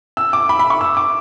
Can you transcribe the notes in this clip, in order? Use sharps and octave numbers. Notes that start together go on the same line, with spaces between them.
E6
D6
B5
B5
C#6
E6
D6